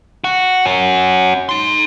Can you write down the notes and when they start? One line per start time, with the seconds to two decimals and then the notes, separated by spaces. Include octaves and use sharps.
0.24 F#4
0.66 C#4 F#4
1.49 D#4 C6